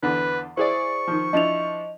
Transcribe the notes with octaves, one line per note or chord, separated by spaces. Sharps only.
E2 D3 B4
E4 G#4 C5 D5 C#6
D#3 F3
F3 D4 E4 D#5 F7